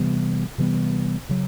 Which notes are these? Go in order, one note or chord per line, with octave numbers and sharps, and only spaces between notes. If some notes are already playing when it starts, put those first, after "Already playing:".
Already playing: C3 E3 G3 B3
C3 E3 G3 B3
C#3 F#3